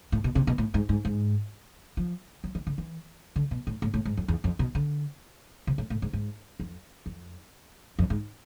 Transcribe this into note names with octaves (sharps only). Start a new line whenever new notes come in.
A2
B2
C3
B2
A2
G#2
G#2
G#2
F3
F3
E3
D3
E3
D3
B2
A2
A2
A2
G#2
F2
E2
F2
B2
D3
C3
A2
A2
G#2
G#2
F2
F2
F2
G#2